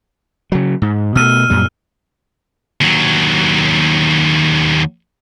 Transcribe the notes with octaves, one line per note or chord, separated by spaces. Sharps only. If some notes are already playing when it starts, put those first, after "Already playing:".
C#3 F#3
G#2
B2 A3 E6 F6 D#7
F#2 A#2 G3
D#2 F#3